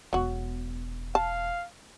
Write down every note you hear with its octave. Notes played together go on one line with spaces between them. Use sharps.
E1 F#3 B3 F#4
F5 A5